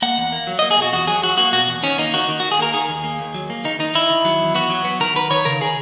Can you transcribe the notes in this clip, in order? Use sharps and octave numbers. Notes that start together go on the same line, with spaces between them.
A#3 F#5
E2
A#3
F#3
A#3 D#5
G#4
B2 F#4
E2 F#4
F#3 G#4
F#3 F#4
A#3 F#4
B2 F#4
E2
D#3 C#4
A#3 D#4
D#3 F#4
D#3
D#3 F#4
G#4
A#3 A#4
D#3 G#4
D#2
A#3
D#2
F#3
A#3
D#3 D#4
D#3 D#4
D#3 E4
D#3
F#3
E2
B3 F#4
F#3
B3
D#3 A#4
D#3 B4
D#3 C#5
C#3 A#4
G#4